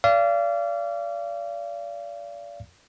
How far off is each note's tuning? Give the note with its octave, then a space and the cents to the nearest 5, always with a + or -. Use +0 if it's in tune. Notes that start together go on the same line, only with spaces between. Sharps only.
D5 -30 F5 -30